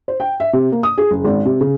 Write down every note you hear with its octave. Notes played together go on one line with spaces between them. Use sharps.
C5
G5
E5
C3
A#3
D#6
G#4
F#1
G#1
C3
C#3